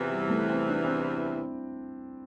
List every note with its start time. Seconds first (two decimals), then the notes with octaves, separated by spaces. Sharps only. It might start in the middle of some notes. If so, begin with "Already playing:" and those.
Already playing: E2 C3 E3 F4
0.10 G3
0.30 A3
0.50 C4
0.69 D4
0.85 C4
1.00 E4